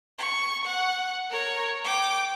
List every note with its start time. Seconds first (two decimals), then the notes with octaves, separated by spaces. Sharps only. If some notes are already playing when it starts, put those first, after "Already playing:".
0.18 C#6
0.65 F#5
1.30 A#4 C#5
1.85 G5 D6